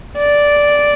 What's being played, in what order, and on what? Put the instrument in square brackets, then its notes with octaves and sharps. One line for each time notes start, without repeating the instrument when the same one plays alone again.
[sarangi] D5